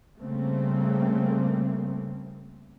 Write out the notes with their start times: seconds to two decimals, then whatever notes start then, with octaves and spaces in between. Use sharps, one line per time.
0.17 C#3 G3 A3 A#3 C4